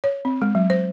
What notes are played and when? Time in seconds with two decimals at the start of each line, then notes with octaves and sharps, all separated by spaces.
0.04 C#5
0.25 C4
0.42 G#3
0.55 F#3
0.70 C5